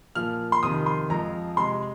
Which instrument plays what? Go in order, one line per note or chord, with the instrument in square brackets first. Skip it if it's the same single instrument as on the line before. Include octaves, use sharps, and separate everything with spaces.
[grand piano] A#2 F3 A#3 F6
C6
F2 C3 D#3 D#6
C6
F2 F3 G#3 A#5
C3 G#3 C6